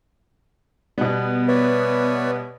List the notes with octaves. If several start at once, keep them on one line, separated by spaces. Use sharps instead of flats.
B2 G3 B3
B4 C#5 D5 E5